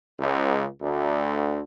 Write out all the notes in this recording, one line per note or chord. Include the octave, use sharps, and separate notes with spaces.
C#2
D2